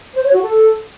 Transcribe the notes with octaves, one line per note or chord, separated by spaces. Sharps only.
C5
C#5
F#4
A4